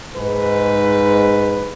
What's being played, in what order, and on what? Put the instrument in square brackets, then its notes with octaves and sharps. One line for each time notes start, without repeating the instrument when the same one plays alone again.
[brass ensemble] G#2 B4